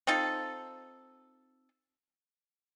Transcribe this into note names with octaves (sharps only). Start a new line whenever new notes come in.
C4 D#4 F4 A4